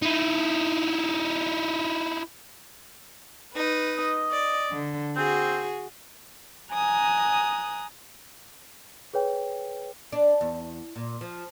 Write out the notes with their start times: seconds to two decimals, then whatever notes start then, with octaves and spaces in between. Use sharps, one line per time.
0.02 D#4 E4
3.53 D#4 B4
3.97 D#5
4.30 D5
4.72 D3
5.16 C4 F#4 G#4
6.72 G#5 A#5 D#6 F#6
9.14 G#4 B4 C#5 G5
10.12 D4
10.41 E2
10.96 A#2
11.21 F3